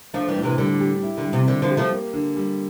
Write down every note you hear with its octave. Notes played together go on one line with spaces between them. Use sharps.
F3 A3 D4
E3 G3
A2
C3 E3
D3 G3
G4
E4
D3
G3
C3
D3 C4
D3 F3
G4
F3 A3
A#3
D3
G3